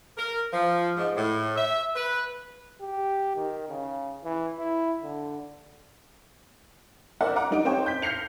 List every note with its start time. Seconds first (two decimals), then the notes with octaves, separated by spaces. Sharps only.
0.17 A#4
0.52 F3
0.97 G#2
1.17 A2
1.57 E5
1.96 B4
2.81 G4
3.36 D#3
3.69 C#3
4.24 E3
4.59 E4
5.03 D3
7.21 A#4 C5 D5 E5 F#5
7.36 F#5 A#5 D6
7.51 G3 D#4 D7
7.65 C4 D#4 C5 C#5 G5
7.86 G6 B6
8.02 F6 G6 A#6 C7 C#7 F7